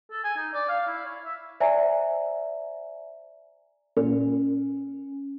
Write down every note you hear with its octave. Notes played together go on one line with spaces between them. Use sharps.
A4
G#5
D#4
D5
F5
E4
C#5
E5
C5 D5 E5 G#5 A#5
A#2 C#4